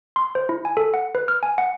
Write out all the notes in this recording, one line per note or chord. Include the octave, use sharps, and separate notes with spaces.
C6
C5
E4
G#5
A4
F#5
B4
F6
G#5
F#5